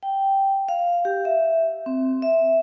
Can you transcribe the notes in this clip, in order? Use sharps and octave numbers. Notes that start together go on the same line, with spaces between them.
G5
F5
G4
E5
C4
E5